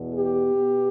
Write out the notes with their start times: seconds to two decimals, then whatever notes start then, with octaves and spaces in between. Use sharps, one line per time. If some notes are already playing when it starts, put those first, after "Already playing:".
Already playing: E2 B2 B3
0.13 G4
0.53 B2 B3